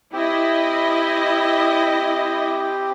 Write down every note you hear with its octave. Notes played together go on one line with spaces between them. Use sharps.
C4 E4 G4 D#5